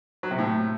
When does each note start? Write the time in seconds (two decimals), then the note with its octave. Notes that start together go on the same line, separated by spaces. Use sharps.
0.23 F#3
0.31 C3
0.38 A2